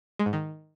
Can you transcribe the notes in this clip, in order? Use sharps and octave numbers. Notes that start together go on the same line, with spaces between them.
G#3
G#2
D#3